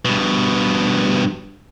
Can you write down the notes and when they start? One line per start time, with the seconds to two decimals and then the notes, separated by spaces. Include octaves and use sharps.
0.05 G2 B2